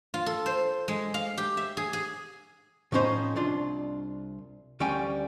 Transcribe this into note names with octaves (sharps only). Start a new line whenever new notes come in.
F4
A4
C5
G#3
F5
G4
E5
G#4
G#4
A2 F3 C#4 D#4 C5 B5
C2 D4 F4
D2 G3 A#3 C#4 G5 G#5